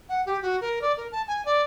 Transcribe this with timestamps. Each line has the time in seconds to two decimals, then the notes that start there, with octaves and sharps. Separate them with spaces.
0.09 F#5
0.26 G4
0.42 F#4
0.61 A#4
0.82 D5
0.97 A#4
1.12 A5
1.28 G#5
1.45 D5